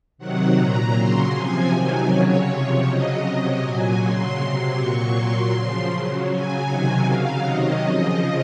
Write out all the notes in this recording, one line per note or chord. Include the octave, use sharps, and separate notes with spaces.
C3 D#3 F#3 F#5
A#2 F#3 A#5
C#3 F#3 C6
C3 F3 G#5
C3 D#3 F#3 G#5
C#3 F#3 C#5
C3 F3
C#3 F#3 D#5
C3 F#3
A#2 F#3 G#5
C#3 F#3 C6
C3 F#3
A#2 F#3 C#6
A#2 F#3 C6
C#3 F3
C#3 F#3
C#3 F#3 G#5
C3 D#3 F#3
C#3 F#3 F5
C3 D#3 F#3 D#5
C#3 F3